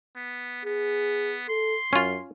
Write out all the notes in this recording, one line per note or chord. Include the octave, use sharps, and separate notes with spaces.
B3
B3 G#4
A4 C6
F#2 C#4 F4